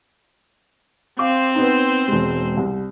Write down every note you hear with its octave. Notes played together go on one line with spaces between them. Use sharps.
C4 C5 F5 D6
B3 D#4
E1 G#3
C2